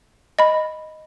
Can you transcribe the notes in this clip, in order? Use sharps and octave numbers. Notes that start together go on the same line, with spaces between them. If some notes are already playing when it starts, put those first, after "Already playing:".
D#5 B5